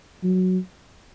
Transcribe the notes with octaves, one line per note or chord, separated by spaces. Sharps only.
F#3